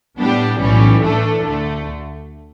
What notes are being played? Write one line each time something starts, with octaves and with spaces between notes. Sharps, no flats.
A2 G3 B3 D4 G4
B1 A2 E3 G3 C#4
A2 E3 A3 D4 A4
D2 D3 A3